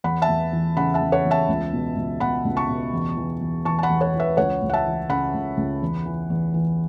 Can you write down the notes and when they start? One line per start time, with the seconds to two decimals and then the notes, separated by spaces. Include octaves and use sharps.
0.04 E2 F#5 B5
0.22 E5 A5
0.29 E2
0.53 E3
0.77 C#3 F#5 B5
0.94 E5 A5
1.01 E2
1.12 C#5 F#5
1.25 E2
1.31 E5 A5
1.48 C#2
1.73 B2
1.96 C#2
2.20 B2 F#5 B5
2.45 C#2
2.56 A5 C#6
2.69 B2
2.93 E2
3.17 E3
3.41 E2
3.65 E3 A5 C#6
3.79 A5
3.83 F#5 B5
3.90 E2
4.01 C#5 F#5
4.13 E3
4.19 B4 E5
4.37 C#2 C#5 F#5
4.62 C#2
4.70 F#5
4.73 E5 A5
4.86 E3
5.09 C#3 F#5 B5
5.34 C#2
5.57 C#2
5.82 E2
6.06 E3
6.30 E2
6.54 E3